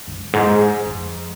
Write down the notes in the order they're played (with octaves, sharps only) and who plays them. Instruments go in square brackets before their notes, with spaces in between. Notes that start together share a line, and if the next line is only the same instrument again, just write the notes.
[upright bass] F#2
G#2
F2